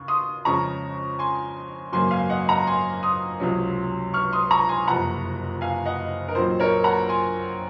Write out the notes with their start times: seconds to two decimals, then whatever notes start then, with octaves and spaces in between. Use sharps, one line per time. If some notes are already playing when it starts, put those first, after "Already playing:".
Already playing: D#2 C#3 C#6
0.08 C6 D#6
0.45 F2 C#3 G#3 C#4 A#5 C#6
1.19 G#5 C6
1.92 G#1 F#2 C#3 F#3 A#3 G#5 C6
2.11 F5 G#5
2.29 D#5 F#5
2.48 F#5 A#5
2.67 G#5 C6
3.03 C6 D#6
3.40 C#2 C3 F#3 C#4
4.14 C#6 F6
4.33 C6 D#6
4.51 A#5 C#6
4.69 G#5 C6
4.87 F#1 F2 C3 F#5 A#5
5.61 F5 G#5
5.86 D#5 F#5
6.28 A#4
6.35 A#1 A#2 F#3 C4 D#4 C5
6.60 A#4 C#5
6.84 F#5 A#5
7.09 G#5 C6